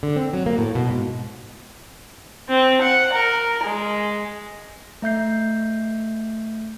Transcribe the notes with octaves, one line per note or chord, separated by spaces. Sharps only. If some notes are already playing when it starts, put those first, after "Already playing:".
D3
C4
F#3
A#3
A2
B2
G#2
C4
F#5
A#4
G#3
A3 E5 G6 C7